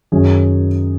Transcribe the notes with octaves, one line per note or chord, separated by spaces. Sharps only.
F#2 D#3 F#3 C#4 G#4